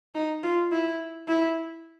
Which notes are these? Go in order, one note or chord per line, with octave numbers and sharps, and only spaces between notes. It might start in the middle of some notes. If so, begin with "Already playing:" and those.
D#4
F4
E4
E4